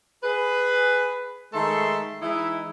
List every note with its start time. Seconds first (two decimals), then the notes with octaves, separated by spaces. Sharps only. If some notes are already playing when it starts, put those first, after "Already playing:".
0.23 G#4 B4
1.53 D#3 G#3 A3 A4 C6
2.21 E3 G#3 D#4 E4